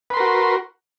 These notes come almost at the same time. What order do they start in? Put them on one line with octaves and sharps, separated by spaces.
B4 C6 A#4 F#4